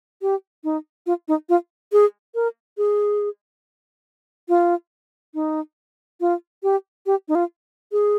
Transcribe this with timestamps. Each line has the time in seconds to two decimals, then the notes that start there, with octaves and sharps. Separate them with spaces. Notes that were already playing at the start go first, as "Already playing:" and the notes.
0.22 G4
0.64 D#4
1.06 F4
1.28 D#4
1.49 F4
1.92 G#4
2.35 A#4
2.78 G#4
4.49 F4
5.34 D#4
6.21 F4
6.63 G4
7.06 G4
7.28 D#4
7.35 F4
7.92 G#4